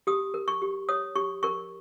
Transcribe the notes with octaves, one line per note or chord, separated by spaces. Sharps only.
G4 D#6
A#4
C#6
G4
C#5 D#6
G4 C#6
A#4 C#6